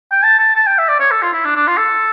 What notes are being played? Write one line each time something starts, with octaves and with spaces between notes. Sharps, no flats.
G5
A5
A5
A5
G5
E5
D5
C#5
A4
F4
E4
D4
D4
F4
A4